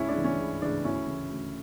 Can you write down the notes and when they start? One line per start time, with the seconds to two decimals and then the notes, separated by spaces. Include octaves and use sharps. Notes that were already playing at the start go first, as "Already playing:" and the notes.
Already playing: C#2 C#4 E4
0.09 D4
0.16 C#3 E3
0.24 C#4
0.39 C#2
0.62 C#3 E3 D4
0.84 D2 C#4 E4
1.07 C#3 E3
1.30 D2